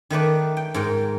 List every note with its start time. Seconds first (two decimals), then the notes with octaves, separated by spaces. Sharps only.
0.10 D#3 A3 B4 D5
0.57 G5
0.74 G#2 A#4 G5